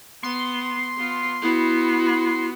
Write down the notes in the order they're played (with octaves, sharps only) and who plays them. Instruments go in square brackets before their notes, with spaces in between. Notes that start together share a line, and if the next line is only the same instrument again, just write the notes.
[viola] B3 [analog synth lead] C6
[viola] B3 F4
[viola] B3 F#4 [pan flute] E4